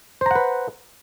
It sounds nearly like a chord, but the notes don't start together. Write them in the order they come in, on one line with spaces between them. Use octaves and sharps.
C5 A#5 F#5 B4